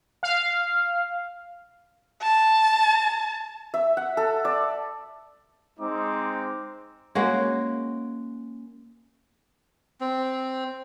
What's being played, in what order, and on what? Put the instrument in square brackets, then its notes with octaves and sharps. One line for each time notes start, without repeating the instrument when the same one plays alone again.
[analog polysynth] F5
[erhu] A5
[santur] E5
F#5
A4
D5
[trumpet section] G#3 C4 D#4 D6
[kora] G#3 A#3 C#4 F#4
[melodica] C4